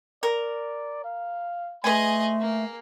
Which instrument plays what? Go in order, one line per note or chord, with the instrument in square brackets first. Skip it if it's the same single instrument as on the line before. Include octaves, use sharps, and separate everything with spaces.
[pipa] A#4 [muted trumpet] D5
[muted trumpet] F5
[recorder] A3 [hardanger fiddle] G#4 D#5 [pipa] B4 G#5 [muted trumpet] C6
[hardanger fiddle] A#3